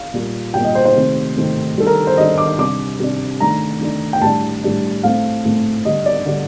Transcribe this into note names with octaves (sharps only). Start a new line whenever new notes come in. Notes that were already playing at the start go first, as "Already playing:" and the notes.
Already playing: F5
A#2 G3 A#3
A#2 G3 A#3 G5
D#5
C5
C5
C3 D#3 A3 C4
C3 D#3 A3 C4
D#3 G3 D4 A4
A#4
C5
D#3 G3 D4 D#5
D6
C3 G3 D4 D6
C3 G3 D4
D#3 A3 D4 A#5
D#3 A3 D4
G5
A2 G3 D4 A5
A2 G3 D4
A2 A3 C4 F5
A2 A3 C4
D3 G3 D4 D#5
D5
D3 G3 D4